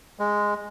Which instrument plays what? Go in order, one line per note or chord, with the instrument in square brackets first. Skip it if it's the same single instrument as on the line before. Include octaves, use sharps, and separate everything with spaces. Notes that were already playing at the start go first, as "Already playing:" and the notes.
[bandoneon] G#3